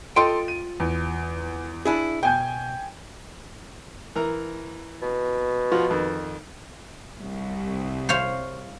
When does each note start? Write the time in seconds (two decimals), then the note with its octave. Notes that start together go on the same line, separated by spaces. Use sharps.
0.16 F4 A4 D#5 G5 C6 D7
0.48 D#7
0.80 E2
1.85 D4 E4 G#4
2.23 B2 G5 G#5 G6
4.16 E3 A#4 A#5
5.02 B2
5.72 F3 F4 F#4
5.91 F2 D#3
7.20 C2
8.09 C5 C#5 F5